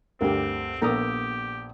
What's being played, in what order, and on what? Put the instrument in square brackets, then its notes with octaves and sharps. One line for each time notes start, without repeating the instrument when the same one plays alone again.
[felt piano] D2 G2 [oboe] C4 [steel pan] G4 A#4
[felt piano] A#1 B3 D#6 [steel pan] A#3 A4 A#5 [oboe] G4